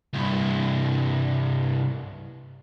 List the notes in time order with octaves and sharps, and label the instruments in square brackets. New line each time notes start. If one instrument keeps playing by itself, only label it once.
[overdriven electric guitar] C2 G2